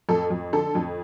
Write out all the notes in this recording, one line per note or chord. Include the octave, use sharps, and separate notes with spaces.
F2 A4
F2
D3 A4
F2